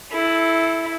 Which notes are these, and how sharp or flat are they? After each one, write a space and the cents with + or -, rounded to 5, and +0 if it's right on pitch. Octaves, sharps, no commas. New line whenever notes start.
E4 +0 A4 -25